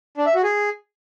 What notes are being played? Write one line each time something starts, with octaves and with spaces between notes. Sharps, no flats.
D4
E5
F#4
G#4